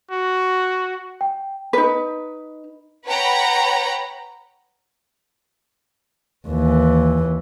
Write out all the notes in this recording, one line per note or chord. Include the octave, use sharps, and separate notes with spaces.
F#4
G5
D#4 B4
B4 C#5 F#5 G5 A#5 B5
D#2 E3